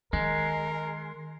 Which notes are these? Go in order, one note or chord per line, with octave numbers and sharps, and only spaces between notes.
D#3 G#3 A#4